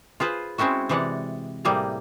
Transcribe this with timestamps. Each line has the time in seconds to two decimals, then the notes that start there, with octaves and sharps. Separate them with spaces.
0.20 F4 G#4 B4 C5
0.58 G#3 C4 C#4 E4 F#4
0.89 C3 E3 G#3 D5 F#5
1.65 A2 C3 G3 A#3 G#4 A#5